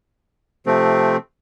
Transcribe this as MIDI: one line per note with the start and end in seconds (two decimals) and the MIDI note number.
0.66 1.17 48
0.66 1.17 53
0.66 1.17 57
0.66 1.17 60